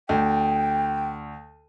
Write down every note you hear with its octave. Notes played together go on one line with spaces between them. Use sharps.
D2 G5